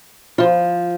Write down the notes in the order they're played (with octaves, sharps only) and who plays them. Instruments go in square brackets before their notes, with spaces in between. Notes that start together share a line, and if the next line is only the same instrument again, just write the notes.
[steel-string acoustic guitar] F3 F4